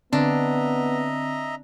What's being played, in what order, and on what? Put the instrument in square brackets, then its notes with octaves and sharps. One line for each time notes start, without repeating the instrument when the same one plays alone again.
[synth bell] D3 C4 [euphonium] B3 [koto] D4 [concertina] D#5 E5 A#5